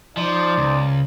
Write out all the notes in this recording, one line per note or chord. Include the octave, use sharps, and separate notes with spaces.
F3 D#4 C5 D5
C#2